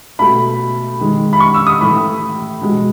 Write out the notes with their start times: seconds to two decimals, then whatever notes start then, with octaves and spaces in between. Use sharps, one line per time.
0.19 B2 A3 B5
1.00 D#3 G#3
1.33 B5
1.40 C#6
1.54 E6
1.67 D#6
1.81 A2 E3 A3 B5
2.61 B2 G#3